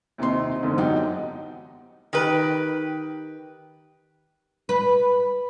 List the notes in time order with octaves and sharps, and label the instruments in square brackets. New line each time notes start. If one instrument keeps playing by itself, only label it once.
[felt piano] D#2 C3 C4 D#4 C6
E2 G#2 D3
B1 F#2 D#4 G4 F#5 G5
[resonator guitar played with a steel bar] D#3 G4 B4
[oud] B4